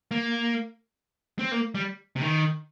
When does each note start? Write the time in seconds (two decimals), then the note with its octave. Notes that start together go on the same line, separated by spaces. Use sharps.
0.11 A#3
1.39 C4
1.52 A#3
1.75 G3
2.16 C3
2.22 D#3